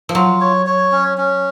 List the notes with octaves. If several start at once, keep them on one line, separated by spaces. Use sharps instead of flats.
F3
F#3 F4
C#5
C#5
C#4
C#4